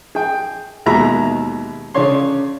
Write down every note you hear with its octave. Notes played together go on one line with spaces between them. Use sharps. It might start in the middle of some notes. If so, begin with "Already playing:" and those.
G#4 G5
D#2 B2 G#3 E5 A#5 B5
C#3 C#4 D4 C#5 C6